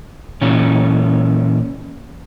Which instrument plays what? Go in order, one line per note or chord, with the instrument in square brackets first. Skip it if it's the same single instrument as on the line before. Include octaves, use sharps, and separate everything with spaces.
[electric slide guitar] A#2 E3 C#4